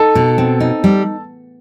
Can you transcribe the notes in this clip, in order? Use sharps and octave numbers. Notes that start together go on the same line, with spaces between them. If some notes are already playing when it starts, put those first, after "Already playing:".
Already playing: D#4 A4
B2
C4
D#4
G3